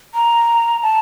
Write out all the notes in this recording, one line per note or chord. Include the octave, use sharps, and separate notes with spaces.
A#5
A5